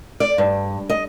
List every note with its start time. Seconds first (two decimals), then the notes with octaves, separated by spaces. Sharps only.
0.20 D5
0.38 G2
0.89 D#5